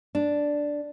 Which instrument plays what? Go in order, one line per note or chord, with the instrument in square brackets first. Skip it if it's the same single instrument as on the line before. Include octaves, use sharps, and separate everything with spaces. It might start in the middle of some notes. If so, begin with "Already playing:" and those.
[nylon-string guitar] D4